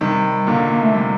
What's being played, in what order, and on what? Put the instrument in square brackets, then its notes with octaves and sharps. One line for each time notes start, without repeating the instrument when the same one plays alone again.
[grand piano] C3 D#3 [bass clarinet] G3
[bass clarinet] G3
[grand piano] A#2 D3 [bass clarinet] A#3
[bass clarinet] A#3
A3
[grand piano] C3 [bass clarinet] G3